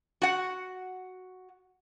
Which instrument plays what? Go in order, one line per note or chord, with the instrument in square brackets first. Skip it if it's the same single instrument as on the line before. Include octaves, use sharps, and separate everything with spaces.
[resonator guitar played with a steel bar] F#4 F#5